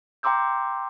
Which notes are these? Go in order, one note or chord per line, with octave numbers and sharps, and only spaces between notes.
G5 A#5 C6 D6 E6 G6